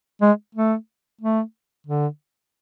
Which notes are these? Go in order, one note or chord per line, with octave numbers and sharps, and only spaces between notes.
G#3
A3
A3
D3